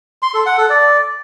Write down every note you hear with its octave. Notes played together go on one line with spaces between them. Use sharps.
C6
A4
F#5
A4
D5